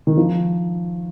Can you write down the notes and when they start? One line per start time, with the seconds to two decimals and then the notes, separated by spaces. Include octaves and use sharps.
0.07 D#3
0.17 F3